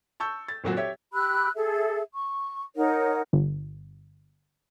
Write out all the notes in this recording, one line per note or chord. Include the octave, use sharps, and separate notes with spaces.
A5 C#6 E6 G6
A6
G#1 A#2 F#3 F#4
G4 C#5 E5
G4 B5 E6 F#6
G#4 A4 E5
C#6
D#4 A#4 C#5 F#5
G1